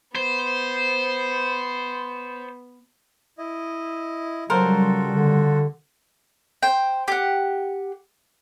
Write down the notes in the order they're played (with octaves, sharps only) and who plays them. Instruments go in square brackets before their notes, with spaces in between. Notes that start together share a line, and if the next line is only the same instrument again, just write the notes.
[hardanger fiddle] B3 [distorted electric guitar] C5
[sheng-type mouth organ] E4 D#5
[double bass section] C#3 G3 [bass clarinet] F#3 [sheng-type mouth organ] F4 F#4 A4 [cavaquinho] A#4 C5
[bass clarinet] D3
[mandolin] C5 G5
G4 F#5